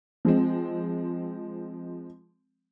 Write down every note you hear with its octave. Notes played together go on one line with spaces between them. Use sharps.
F3 G#3 C4